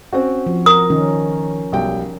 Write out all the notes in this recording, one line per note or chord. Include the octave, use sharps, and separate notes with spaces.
C4 C#4 F#4
F3
A#4 D#6
D#3 C#4
B1 G3 G5